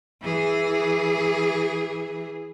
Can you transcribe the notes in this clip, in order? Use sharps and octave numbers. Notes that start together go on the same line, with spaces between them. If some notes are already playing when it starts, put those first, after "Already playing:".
E3 G#4